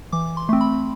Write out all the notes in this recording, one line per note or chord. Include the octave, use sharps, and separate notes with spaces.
E3 D6
C6
A3 C4
B5